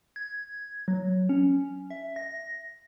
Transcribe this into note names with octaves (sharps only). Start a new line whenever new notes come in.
G#6
F#3
C#4
E5
A#6